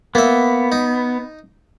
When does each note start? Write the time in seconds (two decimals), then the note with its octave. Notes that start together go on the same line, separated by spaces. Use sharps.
0.15 A#3 B3 E5
0.72 D#4